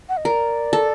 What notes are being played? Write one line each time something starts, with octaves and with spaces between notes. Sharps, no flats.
F#5
D#5
A#4 D5
A4